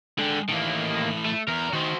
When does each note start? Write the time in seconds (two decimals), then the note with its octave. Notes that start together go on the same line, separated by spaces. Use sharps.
0.18 D3 G#3 G5
0.49 A2 D#3 E3 A#3
1.26 A3
1.48 E2 A#4
1.73 D#3 F#4 C5